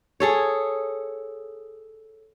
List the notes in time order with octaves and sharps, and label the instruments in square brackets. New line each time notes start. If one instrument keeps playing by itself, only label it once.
[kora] G#4 A4 C#5